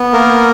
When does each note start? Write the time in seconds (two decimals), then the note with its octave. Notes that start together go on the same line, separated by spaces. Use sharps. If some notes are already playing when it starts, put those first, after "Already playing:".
Already playing: B3
0.13 A#3 A#4